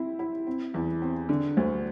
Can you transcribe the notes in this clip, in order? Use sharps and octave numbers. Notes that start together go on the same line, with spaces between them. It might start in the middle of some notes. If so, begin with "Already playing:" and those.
Already playing: C4 E4
E4
C4
E2
C4
D3
D2